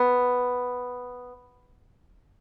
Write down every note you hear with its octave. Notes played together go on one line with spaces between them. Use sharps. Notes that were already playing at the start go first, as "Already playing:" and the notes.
Already playing: B3